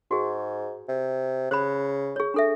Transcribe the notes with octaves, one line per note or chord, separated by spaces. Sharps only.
G#2 F#4 G#4
C3
C#3 C5 B5
G#4 C#5
D4 A4 E5